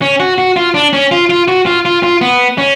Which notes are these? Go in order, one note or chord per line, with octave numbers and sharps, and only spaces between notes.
C#4
F#4
F#4
F4
D4
C#4
F4
F4
F#4
F4
F4
F4
B3
C#4